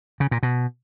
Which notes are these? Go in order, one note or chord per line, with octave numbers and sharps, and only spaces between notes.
C#3
A#2
B2